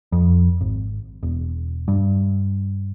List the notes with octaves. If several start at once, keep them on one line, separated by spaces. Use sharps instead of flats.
F2
G#1
E1
G2